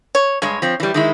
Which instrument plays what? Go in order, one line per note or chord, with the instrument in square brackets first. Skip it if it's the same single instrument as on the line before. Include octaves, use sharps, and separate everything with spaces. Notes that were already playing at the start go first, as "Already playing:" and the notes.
[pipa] C#5
[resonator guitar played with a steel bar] G2 G#3 [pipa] C#5
[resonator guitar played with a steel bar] F3 C4
E3 G3
D#3 G#3 E4